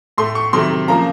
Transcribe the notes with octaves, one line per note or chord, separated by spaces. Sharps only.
A2 A3 C6
C#6
C3 D#3 F#3 A3 C6
C#3 F3 A#3 A#5